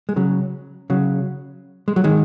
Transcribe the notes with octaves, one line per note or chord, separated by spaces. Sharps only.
G#3
C#3 F#3
C#3 F#3
G#3
F#3
D#3 G#3